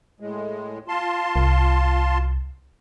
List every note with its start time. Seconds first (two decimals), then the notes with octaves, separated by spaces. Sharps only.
0.20 A2 G#3
0.88 F4 A5 C6
1.36 C2